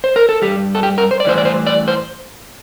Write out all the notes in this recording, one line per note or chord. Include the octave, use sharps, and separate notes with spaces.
C5
A#4
A4
E3 G3 G4
G2
A4
G4
A#4
C5
D5
A2 E3 G3 C5
D5
C5
D5
C5